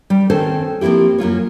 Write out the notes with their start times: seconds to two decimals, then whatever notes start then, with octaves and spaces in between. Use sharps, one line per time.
0.10 G3
0.30 D#3 C4 C#4 A4 C5 A5
0.81 F3 A#3 C4 E4 G4
1.18 F#2 A#3 F4 C#5